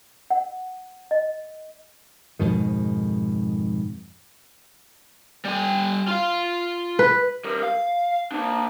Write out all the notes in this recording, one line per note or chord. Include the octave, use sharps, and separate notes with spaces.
F#5
D#5
F2 G#2 B2 D#3
G3 G#5
F4 F5
B4
G3 A#4
F5
A#3 D4